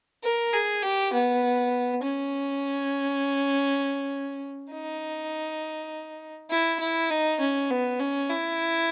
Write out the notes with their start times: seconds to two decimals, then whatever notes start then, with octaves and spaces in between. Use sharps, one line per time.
0.23 A#4
0.53 G#4
0.83 G4
1.13 B3
2.03 C#4
4.71 D#4
6.50 E4
6.80 E4
7.10 D#4
7.40 C#4
7.70 B3
8.00 C#4
8.30 E4